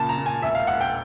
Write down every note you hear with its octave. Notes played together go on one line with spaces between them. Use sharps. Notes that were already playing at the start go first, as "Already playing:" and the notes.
Already playing: A#2 C#3 A5
A#5
A#2
G#5
E1 E5
F5
E1 F#5
G5